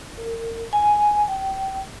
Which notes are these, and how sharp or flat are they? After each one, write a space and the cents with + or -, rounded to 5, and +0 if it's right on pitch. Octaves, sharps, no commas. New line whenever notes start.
A#4 -30
G#5 +5
G5 -25